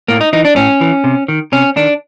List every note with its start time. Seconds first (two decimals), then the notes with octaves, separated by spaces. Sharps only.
0.08 A2 A#3
0.21 D#4
0.33 E3 D#4
0.45 D4
0.56 A2 C#4
0.81 E3
1.04 C3
1.28 D#3
1.52 C3 C#4
1.76 D#3 D4